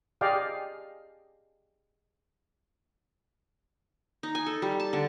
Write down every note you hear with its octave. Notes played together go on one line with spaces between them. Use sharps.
G4 G#4 D5 D#5 F5 G5
D#4
G#5
A4
G3
A5
D3